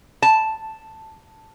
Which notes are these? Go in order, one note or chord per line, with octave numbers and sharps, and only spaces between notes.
A5